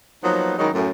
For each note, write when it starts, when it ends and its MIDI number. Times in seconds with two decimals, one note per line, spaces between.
0.24 0.54 53
0.24 0.54 54
0.24 0.54 58
0.24 0.54 59
0.24 0.54 63
0.58 0.69 51
0.58 0.69 54
0.58 0.69 56
0.58 0.69 61
0.58 0.69 63
0.58 0.69 64
0.74 0.90 42
0.74 0.90 45